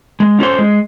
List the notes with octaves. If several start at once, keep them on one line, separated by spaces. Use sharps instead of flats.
G#3
C#4 F4 A4 C5
G#3